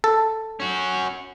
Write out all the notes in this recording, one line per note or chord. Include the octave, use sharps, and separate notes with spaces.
A4
C#4 F#4